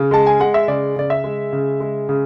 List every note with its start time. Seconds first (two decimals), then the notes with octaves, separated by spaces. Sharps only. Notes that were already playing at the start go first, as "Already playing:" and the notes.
Already playing: C#3
0.11 G#3 A5
0.27 G#5
0.40 G#3 F#5
0.54 E5
0.68 C#3 D5
0.96 C#3 D5
1.10 E5
1.24 G#3
1.52 C#3
1.80 G#3
2.09 C#3